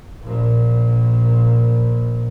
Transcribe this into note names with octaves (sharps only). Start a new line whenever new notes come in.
A#1 A#2